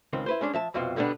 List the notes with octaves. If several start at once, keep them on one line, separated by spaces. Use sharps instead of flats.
C#2 D#3 C4
E4 B4 C5
G#3 C#4 D4
F3 E5 A5
C2 F2 B2 C4 F4
B2 D3 G3 B3 D4